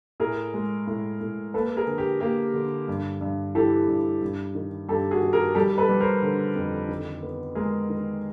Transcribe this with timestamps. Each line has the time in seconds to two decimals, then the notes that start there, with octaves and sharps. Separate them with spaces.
0.20 A2 G#4 A#4
0.54 G#3
0.87 A2
1.21 A2
1.54 A#3 A4 B4
1.77 G#4 A#4
1.87 D3
1.98 G4
2.20 A#3 G4
2.54 D3
2.88 G2
3.21 G2
3.55 E3 G4 A4
3.88 G2
4.22 G2
4.55 D#3
4.89 G2 G4 A4
5.11 F#4 G#4
5.22 D#3
5.33 G#4 A#4
5.55 G3 G4 A4
5.78 A4 B4
5.89 G3
6.00 A#4 C5
6.22 D3
6.55 F2
6.89 D#3
7.23 B3
7.55 G#3 G#4 A#4
7.90 D#3